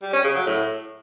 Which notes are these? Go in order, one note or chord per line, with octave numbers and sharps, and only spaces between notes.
G3
C#4
C#3
F#3
A2